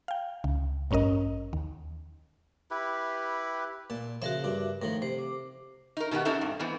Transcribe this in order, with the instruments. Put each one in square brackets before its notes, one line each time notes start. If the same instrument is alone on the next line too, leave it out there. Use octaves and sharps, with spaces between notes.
[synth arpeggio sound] F5 G5
C#2
A1 G2 C#4 A#4 D#5
D#2
[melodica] E4 G4 B4
[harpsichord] A#2 A5
[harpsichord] C#3 F3 [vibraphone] F#4 A#4 E5
[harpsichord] G2 D4
[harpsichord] A2 D#3 F3 [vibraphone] A#4
[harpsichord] C3 [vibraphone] C5
[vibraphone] D6
[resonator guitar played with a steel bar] D#4 A#4
B2 D#3 B3 G4 F#5
C4 C#4 D#4 A4 A#4 E5
G2
G#2 E3 B3 C4